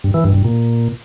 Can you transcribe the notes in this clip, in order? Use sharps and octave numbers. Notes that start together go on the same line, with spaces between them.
G2
E3
G2
G2
A#2